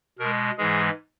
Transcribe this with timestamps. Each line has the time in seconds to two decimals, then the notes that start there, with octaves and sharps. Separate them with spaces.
0.19 B2 G#3 A#4
0.58 G#2 E3 G#3 G#4